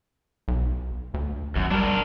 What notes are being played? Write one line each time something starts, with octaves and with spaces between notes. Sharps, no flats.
B1
D2
G#1 F#2
G3 D4 A#4